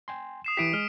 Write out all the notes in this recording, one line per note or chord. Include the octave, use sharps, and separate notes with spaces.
G5 G#5 C6
D#6 C7 E7
E3 E4 G4 B6 D7 D#7
G#3 F6